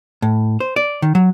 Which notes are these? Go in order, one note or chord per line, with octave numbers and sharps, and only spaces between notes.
A2
C5
D5
D#3
F#3